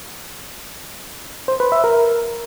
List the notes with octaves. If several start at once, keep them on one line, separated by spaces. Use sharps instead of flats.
C5
B4
E5
A#4